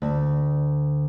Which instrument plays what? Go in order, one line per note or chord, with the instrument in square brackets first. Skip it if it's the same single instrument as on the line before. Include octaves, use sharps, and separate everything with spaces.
[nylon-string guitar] D2